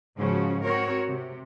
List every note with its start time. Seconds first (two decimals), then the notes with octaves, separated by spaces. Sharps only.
0.17 G#2 C#3 F3 C#4 F#4
0.64 C4 F#4 A#4 C#5
1.09 C3